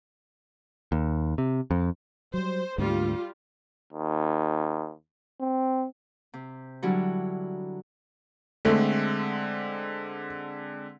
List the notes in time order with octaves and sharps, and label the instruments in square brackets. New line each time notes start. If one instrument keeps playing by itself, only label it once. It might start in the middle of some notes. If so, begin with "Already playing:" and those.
[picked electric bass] D#2
C3
F2
[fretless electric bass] F#3 G3 [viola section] C5
[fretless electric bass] D2 G#2 B3 [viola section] G3 F4
[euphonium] D#2
C4
[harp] C3
D3 F#3 G3 E4
[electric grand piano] D3 G#3 C4 [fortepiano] A3